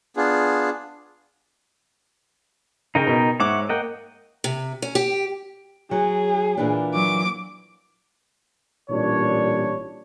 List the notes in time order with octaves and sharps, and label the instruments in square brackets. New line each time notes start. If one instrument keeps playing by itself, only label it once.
[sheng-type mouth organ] B3 D4 F4 G#4
[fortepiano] C#3 [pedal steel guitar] D#4 A#4 G5
[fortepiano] B2
[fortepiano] G#2 D6 [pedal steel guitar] C#5 E5 F#5
[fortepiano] A#3 [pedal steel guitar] D#5 F#5 G5
[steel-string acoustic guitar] C3
C#4
G4
[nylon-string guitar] F#3 [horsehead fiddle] G#4
[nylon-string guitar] A#2 E3 D4
[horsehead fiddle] F#3 [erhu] D6
[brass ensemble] A1 A#2 G3 D4 C#5